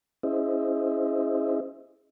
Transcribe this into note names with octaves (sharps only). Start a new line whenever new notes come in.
C#4 E4 G#4 C5 D#5 E5